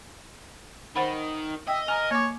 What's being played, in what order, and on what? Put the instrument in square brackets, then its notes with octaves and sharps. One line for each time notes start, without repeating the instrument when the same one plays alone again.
[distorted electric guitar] D#3 [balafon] C5 F#5 B5
[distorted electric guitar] D#5 [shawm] E5 [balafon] G5
[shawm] A#4 [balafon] G#5 A#5
[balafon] A#3 D6 [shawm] C#5